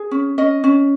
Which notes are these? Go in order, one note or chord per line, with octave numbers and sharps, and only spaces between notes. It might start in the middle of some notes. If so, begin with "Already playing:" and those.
Already playing: G#4
C#4
C#4 D#5
C#4